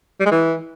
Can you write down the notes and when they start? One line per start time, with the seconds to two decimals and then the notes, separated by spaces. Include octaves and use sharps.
0.20 G3
0.26 G#3
0.31 E3